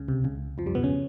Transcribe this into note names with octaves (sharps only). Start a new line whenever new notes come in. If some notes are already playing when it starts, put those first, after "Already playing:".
Already playing: C#2 C#3
C2 C3
C#2 C#3
F2 F3
G2 G3
B2 B3
C#3 C#4